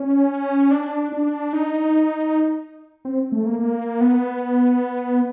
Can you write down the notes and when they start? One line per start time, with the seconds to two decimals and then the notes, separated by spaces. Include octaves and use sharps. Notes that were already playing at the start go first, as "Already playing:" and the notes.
Already playing: C#4
0.71 D4
1.12 D4
1.53 D#4
3.05 C4
3.32 A3
3.46 A#3
3.59 A#3
4.01 B3